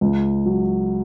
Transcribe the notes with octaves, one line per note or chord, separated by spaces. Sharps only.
C#2
F#3